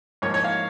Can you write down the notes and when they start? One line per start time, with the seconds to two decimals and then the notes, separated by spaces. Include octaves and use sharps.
0.22 G#2 F3 A#3 C#5
0.34 C#5
0.44 F5